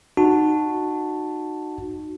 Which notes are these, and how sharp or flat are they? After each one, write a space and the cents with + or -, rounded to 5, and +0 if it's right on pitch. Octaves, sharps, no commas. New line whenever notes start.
D#4 -25 F#4 -10 A5 +0